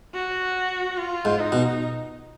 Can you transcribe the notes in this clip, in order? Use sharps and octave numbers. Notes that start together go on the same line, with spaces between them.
F#4
F4
G#2
D#4
B2